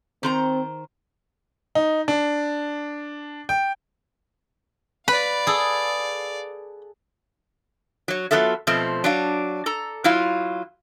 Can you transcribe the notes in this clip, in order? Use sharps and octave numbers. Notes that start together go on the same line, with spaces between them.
D#3 C4 C5 A#5
D#4
D4
G5
B4 D5 F5 B5
G#4 A4
F#3 C#5
F#3 B3 F4 A4 E5
B2 F3 A3 C4
F#3 D4 F5
A4 A#5
F#3 E4 F4 F5